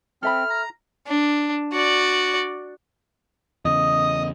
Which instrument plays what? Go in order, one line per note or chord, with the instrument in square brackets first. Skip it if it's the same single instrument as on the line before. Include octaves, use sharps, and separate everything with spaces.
[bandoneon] C4 [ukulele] A4 E5 B5 [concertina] F6
[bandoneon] A#5
[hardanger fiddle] D4
F#4 D5
[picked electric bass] E2 C#3 [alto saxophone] D#5 [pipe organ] D#6